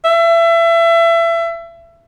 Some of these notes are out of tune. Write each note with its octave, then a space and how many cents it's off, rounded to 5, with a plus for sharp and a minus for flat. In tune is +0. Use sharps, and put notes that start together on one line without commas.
E5 +30